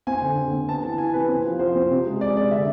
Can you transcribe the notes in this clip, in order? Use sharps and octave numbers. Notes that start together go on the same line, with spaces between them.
C4 G#5
D3
D3
C4
B3 A5
E3 A5
E3 G#5
C3 B4
C4
F3
F3 C5
C4
C3
G#3
G#3 D5
C3 D5
D3 E5